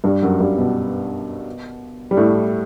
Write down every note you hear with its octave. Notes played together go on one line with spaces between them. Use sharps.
G2 G3
F#2 F#3
G2 G3
B2 B3
G3
A2 A3